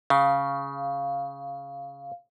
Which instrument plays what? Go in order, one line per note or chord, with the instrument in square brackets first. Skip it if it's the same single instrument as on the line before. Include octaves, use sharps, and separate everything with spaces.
[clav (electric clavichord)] C#3 [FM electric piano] F5